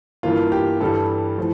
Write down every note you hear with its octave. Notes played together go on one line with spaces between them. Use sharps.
G2 E3 A#3 F4
G4
G2 E3 G3 A4
A2 F3